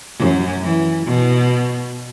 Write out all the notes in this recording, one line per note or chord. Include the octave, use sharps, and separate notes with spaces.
F#2
E3
B2